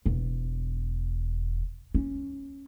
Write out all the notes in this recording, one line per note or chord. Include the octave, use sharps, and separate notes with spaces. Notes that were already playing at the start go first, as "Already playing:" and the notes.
E1
C#4